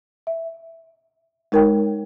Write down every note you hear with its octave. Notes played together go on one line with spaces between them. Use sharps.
E5
G#3 D#4 A#4 C#5 G5